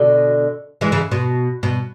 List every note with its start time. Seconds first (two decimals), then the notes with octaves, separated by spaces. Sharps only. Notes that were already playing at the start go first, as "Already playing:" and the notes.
Already playing: B2 D3
0.81 E3 G#3
0.92 C#3 E3
1.11 B2
1.63 B2